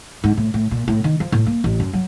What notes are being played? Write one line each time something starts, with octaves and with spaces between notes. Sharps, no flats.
G#2
A2
A2
A#2
A2
D#3
F3
A2
A#3
A1
F#2
F#3